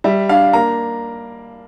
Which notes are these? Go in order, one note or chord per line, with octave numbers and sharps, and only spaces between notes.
G3 E5
D4 F5
A#3 A#5